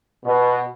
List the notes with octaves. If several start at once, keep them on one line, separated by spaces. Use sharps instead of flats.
B2